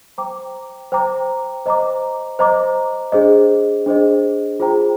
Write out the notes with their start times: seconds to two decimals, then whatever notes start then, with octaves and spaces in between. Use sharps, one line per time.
0.18 C5 G5 A#5 D6
0.92 C5 G5 A#5 D6
1.66 C5 D#5 A#5 D6
2.39 C5 D#5 A#5 D6
3.12 D4 G#4 C5 D#5
3.86 D4 G#4 C5 D#5
4.60 F4 G#4 C5 G5 A#5